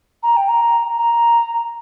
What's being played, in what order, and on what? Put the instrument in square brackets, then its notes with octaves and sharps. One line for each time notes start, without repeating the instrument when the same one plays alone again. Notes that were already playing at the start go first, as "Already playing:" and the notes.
[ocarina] A#5
G5
A#5
A#5